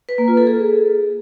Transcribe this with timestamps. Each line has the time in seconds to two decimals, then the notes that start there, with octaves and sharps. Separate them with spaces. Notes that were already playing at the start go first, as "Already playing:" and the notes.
0.09 B4
0.18 A#3
0.28 F4
0.37 A4
0.47 G#4